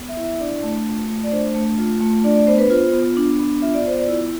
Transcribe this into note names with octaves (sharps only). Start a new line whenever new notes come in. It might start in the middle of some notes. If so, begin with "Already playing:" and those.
Already playing: B3
E5
E4
E5
D4 D5
A3
F4
A3
D5
D4 C5
A3
F4
A3
D4 D5
D5
B3 C5
B4
F4 C5
B3
D4
B3
F4 E5
D5
B3 C5
D5
E4